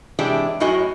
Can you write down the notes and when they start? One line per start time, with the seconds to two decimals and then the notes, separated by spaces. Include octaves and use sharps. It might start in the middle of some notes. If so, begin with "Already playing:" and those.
0.19 C3 E3 G#3 D4 G4
0.60 F#2 A2 F#3 F#4 D#5 G#5